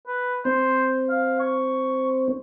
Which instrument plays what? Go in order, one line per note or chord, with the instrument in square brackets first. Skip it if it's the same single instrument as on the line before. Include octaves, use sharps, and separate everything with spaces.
[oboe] B4
[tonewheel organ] C4 [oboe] C5
[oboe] F5
C#6